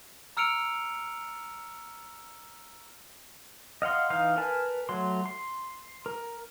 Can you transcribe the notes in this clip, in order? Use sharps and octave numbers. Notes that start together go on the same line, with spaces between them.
A#5 E6 F6 C#7 D7 F7
D#5 F5 F#5 C6
E3 D#4 F5 F6
A#4 B4 G#5 A5
F#3 A3 C6
C6
A#4